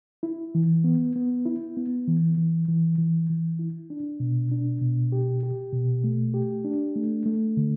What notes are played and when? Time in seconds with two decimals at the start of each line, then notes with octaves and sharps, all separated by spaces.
0.23 E4
0.55 E3
0.84 B3
1.16 B3
1.46 E4
1.77 B3
2.07 E3
2.37 E3
2.68 E3
2.98 E3
3.29 E3
3.59 E4
3.90 D4
4.20 B2
4.52 D4
4.81 B2
5.12 G4
5.43 G4
5.73 B2
6.04 A3
6.34 G4
6.65 D4
6.96 A3
7.26 A3
7.57 D3